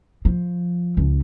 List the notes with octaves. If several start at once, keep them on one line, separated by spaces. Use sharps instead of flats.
F3
C#2